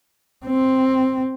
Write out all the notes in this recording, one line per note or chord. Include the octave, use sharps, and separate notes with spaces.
C4